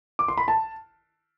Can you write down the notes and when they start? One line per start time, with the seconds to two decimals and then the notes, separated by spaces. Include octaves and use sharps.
0.19 D6
0.28 C6
0.38 B5
0.48 A5